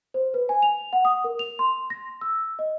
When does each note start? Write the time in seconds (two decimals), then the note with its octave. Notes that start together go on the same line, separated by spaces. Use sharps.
0.14 C5
0.34 B4
0.49 G#5
0.63 F7
0.93 F#5
1.05 D#6
1.24 A#4
1.39 F7
1.59 C6
1.90 A#6
2.21 E6
2.59 D#5